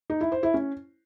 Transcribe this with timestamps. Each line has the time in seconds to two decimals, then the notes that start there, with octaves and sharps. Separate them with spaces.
0.10 D#4
0.21 E4
0.32 C5
0.43 E4
0.54 C#4